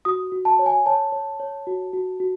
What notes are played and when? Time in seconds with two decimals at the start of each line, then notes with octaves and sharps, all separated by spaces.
0.05 F#4 D#6
0.32 F#4
0.45 A5
0.59 C#5
0.66 G#5
0.86 C#5 A5
1.12 C#5
1.40 C#5
1.67 F#4
1.93 F#4
2.20 F#4